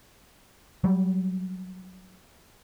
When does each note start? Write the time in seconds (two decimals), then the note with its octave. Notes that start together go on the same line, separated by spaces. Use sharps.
0.84 F#3 G3